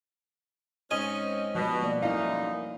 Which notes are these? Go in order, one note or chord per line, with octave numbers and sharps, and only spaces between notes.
G#2 C4 C#4 D#5 G#5
B2 F3 G3
A#3 D5
F#2 A3 D#4 E4 F5